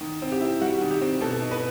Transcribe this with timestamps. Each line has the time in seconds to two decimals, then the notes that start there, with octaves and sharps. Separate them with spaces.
0.01 D#3
0.22 C4
0.32 G4
0.41 E4
0.61 G3 F#4
0.81 D#3
0.91 G4
1.01 C4
1.21 B2 A4
1.41 D#4
1.51 B4